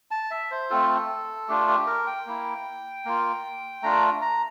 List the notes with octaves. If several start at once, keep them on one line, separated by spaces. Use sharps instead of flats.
A5
E5
C5
A3 C4 F4 A4
A3 D4 F4 G4
G4
A#4
G5
A#3 E4
A#3 F4
A3 D4 F4 A#5
A#5